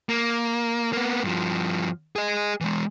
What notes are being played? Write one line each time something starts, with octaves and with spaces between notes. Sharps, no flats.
A#3
A#3 B3
G2 F3
G#4 D#5
E3 G#3